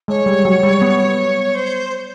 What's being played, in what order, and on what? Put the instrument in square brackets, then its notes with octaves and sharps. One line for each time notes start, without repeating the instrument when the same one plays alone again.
[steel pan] G#3 [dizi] C#5
[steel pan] G3
F#3
G3
B3
[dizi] C5